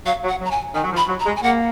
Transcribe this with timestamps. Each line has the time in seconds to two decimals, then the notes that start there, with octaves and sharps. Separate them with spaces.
0.06 F#3 F5
0.23 F#3
0.29 F#5
0.41 F#3
0.45 A#5
0.51 G#5
0.75 D#3 G#5
0.84 F#3
0.92 F3
0.97 B5
1.08 F#3
1.20 A#5
1.26 G#3
1.36 G#5
1.43 A#3 F#5